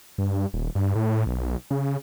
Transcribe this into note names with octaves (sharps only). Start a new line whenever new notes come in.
G2
D#1
G2
A2
B1
C#3